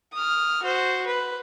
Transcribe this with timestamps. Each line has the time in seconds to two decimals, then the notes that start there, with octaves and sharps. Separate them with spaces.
0.13 D#6 F6
0.63 F#4 C5
1.07 B4